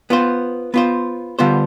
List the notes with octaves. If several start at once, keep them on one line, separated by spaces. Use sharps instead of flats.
B3 F4 C5
B3 F4 C5
D3 G3 B3 F4 C5